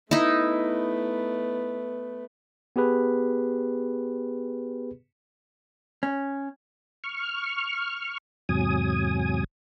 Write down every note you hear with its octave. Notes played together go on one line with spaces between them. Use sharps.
A3 B3 D#4 E4
B3 G4 G#4 B4
C#4
C#6 F6
E2 G#2 C3 F#3 G#5 D#6